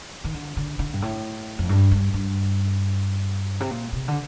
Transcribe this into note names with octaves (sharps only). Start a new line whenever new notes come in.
D#3
D3
D3
D3
G2
A2
F2
G2
G2
G2
C3
A#2
C3
D3